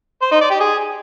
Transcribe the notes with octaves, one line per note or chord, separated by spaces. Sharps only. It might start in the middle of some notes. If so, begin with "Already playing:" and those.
C5
D#4
D5
G4
G#4